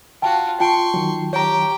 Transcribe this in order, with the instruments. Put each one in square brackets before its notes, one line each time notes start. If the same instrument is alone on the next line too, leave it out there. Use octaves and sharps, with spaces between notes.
[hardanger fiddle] F4 F#4 [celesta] G5 A5
[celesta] F4 A5 D7 [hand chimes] G5 [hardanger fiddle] C6 C#6
[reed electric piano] D#3 F#3
[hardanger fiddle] G4 G5 [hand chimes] C#5 A#5